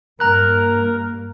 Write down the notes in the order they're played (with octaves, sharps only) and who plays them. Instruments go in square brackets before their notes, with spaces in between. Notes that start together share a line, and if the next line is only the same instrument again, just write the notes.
[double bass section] G2 A#3 [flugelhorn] A#4 [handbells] A#5 F#6